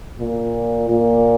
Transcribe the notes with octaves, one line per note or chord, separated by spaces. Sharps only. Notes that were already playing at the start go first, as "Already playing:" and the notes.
A#2
A#2